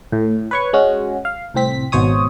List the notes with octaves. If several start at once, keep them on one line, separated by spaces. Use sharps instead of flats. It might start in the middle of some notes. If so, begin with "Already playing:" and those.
A2
B4 C#5 C#6
G#3 C#4 F#4
F5
C2 A2 C4 B6
G#1 B2 C5 C#5 D#6